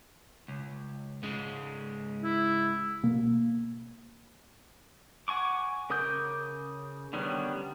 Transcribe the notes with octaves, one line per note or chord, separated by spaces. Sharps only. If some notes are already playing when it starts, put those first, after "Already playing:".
C#2
G#2 C#3 G#3
E4
B2 A#3
F#5 G#5 C#6 D6
C#3 A#4 D6 D#6 G6
D3 D#3 G3 B3 C#4